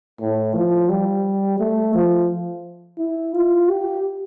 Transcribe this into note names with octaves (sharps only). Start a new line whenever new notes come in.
A2
F3
G3
A3
F3
E4
F4
G4